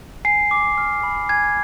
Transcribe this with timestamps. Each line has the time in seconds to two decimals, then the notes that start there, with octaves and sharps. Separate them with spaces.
0.25 G#5 C7
0.51 D6
0.78 F6
1.03 B5
1.29 G#5 G#6